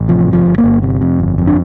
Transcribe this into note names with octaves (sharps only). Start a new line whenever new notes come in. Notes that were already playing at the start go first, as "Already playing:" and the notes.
Already playing: A1
C3 F3
G1
F3
G1
A#3
G1
C3
F2
G1
F2
D4